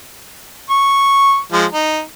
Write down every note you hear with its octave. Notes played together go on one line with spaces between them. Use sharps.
C#6
F3 G#3
D#4